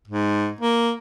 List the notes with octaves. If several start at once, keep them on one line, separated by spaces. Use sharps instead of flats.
G#2
A#3